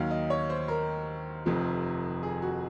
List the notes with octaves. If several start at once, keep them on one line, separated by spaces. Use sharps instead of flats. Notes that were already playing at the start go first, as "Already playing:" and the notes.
Already playing: D#2 D#3 F#3 F5
D#5
C#5
C5
A#4
F1 F2 C3 F3
G#4
F#4